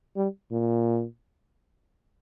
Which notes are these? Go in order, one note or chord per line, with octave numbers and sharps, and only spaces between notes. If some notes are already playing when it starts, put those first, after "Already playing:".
G3
A#2